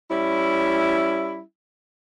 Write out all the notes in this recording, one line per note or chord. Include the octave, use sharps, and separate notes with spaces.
G3 C#4 E4